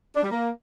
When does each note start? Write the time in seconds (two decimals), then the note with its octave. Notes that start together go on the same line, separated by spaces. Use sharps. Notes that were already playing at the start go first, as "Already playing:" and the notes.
0.16 D4
0.23 G3
0.31 A#3